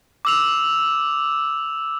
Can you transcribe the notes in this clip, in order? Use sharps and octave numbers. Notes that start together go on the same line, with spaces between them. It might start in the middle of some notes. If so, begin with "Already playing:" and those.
D6 E6 F7